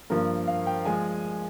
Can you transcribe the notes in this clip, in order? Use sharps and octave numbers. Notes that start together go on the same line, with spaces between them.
G2 F3 A#3 A#4
F5
G5
F3 G#3 G#5